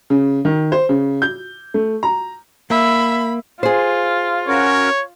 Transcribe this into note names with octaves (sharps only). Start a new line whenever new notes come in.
C#3
D#3
C5
C#3
G6
A3
A#5
A#3 E5 B5
F4 G#4 C5
C#4 F#4 A#4 C#5